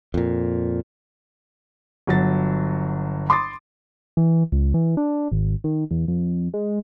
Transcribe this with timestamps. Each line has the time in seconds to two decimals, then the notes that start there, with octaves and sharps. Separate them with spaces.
0.14 F2 A#2
2.07 G1 F#3 A6
3.29 B5 C6 D6 D#6 A6
4.17 E3
4.52 C#2
4.74 E3
4.97 D4
5.32 G#1
5.64 D#3
5.91 E2
6.08 F2
6.54 G#3